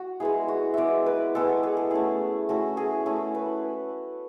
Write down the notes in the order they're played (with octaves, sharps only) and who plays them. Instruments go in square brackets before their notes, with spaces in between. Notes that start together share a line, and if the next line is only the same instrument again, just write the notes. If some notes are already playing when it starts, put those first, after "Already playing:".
Already playing: [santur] F#4
G#3 B3 E4 G#4
F#4
G#3 B3 E4 D5 E5
B4
G#3 B3 E4 A4
G#4
A4
A3 C#4 E4 G#4
A3 C#4 E4 F#4
G#4
A3 C#4 E4 A4
B4